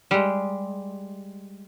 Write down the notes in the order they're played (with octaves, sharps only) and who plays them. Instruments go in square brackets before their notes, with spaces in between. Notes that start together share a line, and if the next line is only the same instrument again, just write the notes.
[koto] G3 G#3